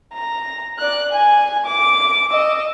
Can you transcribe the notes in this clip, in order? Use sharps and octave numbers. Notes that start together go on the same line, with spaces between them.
A#5
D5 F#6
G#5
D6
D#5 E6